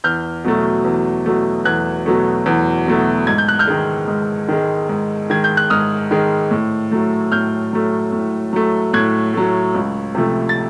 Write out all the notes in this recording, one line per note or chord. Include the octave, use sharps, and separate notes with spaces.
E2 F6 G6
B2 F#3 A3
E2
B2 F#3 A3
E2 F#6 G#6
B2 F#3 A3
E2
B2 F#3 A3
G#2 G#6
G6
F#6
F6 G6
D#3 G#3
G#2
D#3 G#3
G#2
D#3 G#3 G#6
G6
F#6
G#2 D#6 F6
D#3 G#3
A2
F#3 A3
A2 F6 G6
F#3 A3
A2
F#3 A3
A2 F#6 G#6
F#3 A3
C#2
C3 F3 A3
A6